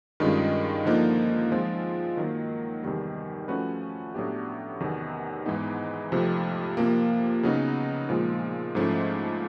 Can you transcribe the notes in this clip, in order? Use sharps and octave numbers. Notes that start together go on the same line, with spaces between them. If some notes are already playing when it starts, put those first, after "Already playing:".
G2 D#3 G#3 C#4 F4
D3 F3 A#3 D#4
F3 G#3 C4 F4
D#3 F#3 A#3
E2 C3 D#3 G3
F3 A3 C#4 F#4 B4
A2 F#3 B3 D4 G4
E2 C3 D#3 F#3 B3
G#2 E3 G#3 B3 D#4
F2 C3 F3 A3
C3 F3 A#3
C#3 F#3 B3 D#4
A#2 F3 G#3
G#2 F3 A3 C#4 E4